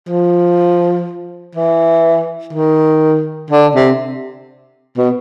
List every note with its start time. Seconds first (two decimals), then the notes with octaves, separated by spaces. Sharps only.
0.09 F3
1.55 E3
2.53 D#3
3.50 D3
3.75 C3
4.97 B2